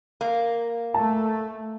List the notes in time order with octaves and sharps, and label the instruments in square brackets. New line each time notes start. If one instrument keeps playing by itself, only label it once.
[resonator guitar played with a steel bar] A#3
[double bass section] A3 [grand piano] A5